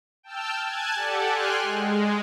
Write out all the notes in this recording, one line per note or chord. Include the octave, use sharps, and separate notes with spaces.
G5 A5 E6 F6 G6
G#5 A5 F#6 G#6
G4 A4 D5 F#5
G5 G#5 C6 F6 F#6
G#3